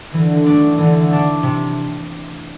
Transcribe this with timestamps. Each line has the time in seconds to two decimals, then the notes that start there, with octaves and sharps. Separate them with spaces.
0.14 D3 E3
0.46 A3 D4
0.77 D3 E3
1.11 A3 D4
1.43 C3